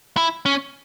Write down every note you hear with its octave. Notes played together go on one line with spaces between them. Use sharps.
E4
C#4